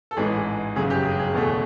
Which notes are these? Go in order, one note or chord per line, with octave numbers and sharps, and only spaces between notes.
A4
A1 G#2 E3 G#3 G#4
G1 F#2 C#3 F#3 G#4
G4
G#4
G#4
E2 B2 F#3 A3